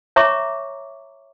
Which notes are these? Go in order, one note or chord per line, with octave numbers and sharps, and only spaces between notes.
C#5 E5 A#5 C#6 D6